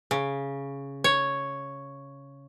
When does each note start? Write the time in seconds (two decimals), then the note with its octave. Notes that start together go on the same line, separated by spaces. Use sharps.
0.11 C#3
1.04 C#5